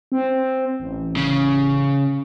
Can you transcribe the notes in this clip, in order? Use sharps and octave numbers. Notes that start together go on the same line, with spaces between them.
C4
A1
C#3